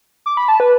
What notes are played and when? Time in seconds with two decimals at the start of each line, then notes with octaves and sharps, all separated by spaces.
0.26 D6
0.37 B5
0.48 A5
0.60 B4